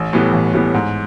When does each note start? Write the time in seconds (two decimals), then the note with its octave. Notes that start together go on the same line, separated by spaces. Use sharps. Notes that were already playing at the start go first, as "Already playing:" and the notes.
Already playing: A1
0.13 A2 E3 G3 B3
0.33 A1
0.53 A2 E3 G3 B3
0.74 G#2